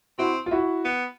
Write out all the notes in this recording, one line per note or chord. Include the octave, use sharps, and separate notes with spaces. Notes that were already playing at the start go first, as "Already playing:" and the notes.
C4 E4 F#4
F4
E4 F#4
B3